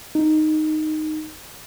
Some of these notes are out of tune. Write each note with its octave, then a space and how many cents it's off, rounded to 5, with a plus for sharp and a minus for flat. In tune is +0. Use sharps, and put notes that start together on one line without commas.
D#4 -5